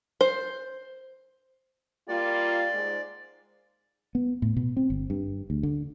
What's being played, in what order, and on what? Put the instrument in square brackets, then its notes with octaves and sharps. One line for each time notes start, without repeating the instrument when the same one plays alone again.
[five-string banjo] C5
[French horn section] G3 A#3 F4 [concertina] D5
[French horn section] G#2
[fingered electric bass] B3
A2
B2
C4
G1
G2
D2
D3